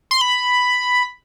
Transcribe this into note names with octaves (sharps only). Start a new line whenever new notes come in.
C6
B5